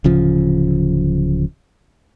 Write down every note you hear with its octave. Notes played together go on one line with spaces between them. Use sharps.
D1 C#3 F3